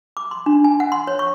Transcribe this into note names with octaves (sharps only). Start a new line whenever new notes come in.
D6
C6
D4
G#5
F#5
C6
C#5
C#6